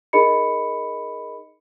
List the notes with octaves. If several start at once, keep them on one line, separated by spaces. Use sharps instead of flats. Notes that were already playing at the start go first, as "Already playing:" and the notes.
D#4 G#4 A#4 D#5 B5 C#7